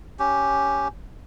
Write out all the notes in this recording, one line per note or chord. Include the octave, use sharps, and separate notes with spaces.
C#4 G4